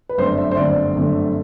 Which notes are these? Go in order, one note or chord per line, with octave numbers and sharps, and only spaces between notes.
B4
G1 F#2 D3 A3 C4 C5
E5
C5
G1 F#2 D3 A3 C4 D5
G1 F#2 D3 A3 C4